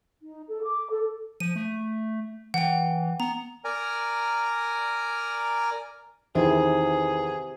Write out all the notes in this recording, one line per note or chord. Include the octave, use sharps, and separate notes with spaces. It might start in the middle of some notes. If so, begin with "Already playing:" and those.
D#4
A4
D6
A4
F3 D#7
A3
E3 F#5 G5
B3 A#5
A#4 D5 G#5 A#5
E2 C3 D#3 E4 G#4